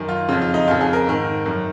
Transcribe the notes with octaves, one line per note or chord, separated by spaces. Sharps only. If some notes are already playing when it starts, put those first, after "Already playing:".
Already playing: F#2 D#3
F4
F2 C#3 F4
F4
D#4
F2 C#3 F4
G#4
A#4
G#2 D#3
F#2 D#3